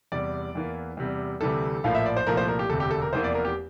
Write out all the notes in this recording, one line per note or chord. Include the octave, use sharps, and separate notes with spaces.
E2 C3 G3 D5
E2 E3 A#3
E2 C3 G3
D2 C3 E3 G3 A4
A#1 A2 F3 A#3 F5
E5
D5
C5
C2 A#2 F3 A3 A#4
C5
A#4
G4
E1 D2 C3 A4
G4
A4
A#4
F1 E2 E3 A#3 C5
D5
A#4
G4